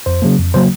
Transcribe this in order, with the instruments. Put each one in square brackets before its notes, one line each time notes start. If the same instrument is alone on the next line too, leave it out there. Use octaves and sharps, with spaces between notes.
[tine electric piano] F2 C5
C#3 F#3 A#3
F2
C#3 F#3 A#3 C5